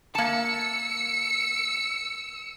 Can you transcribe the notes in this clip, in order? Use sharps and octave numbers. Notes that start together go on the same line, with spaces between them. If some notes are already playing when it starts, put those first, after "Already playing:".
A#3 A5 E6 C#7